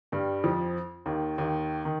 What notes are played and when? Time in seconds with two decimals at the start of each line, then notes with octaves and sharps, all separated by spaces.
0.12 G2 G3
0.44 F2 F3
1.06 D#2 D#3
1.38 D#2 D#3
1.85 D#3